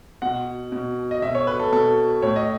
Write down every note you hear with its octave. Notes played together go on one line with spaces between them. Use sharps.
B2 F#5
B2
D#5
B2 E5
C#5
B4
A4
B2 A4
A2 C#5
D#5